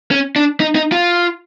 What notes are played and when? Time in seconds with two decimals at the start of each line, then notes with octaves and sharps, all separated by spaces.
0.11 C#4
0.36 D4
0.60 D#4
0.75 D#4
0.92 F4